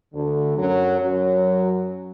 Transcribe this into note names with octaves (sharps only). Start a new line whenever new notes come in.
D2 D3
F#2 F#3
F#2 F#3